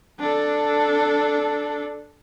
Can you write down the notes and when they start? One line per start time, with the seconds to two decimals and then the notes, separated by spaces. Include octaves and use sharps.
0.19 D4 A4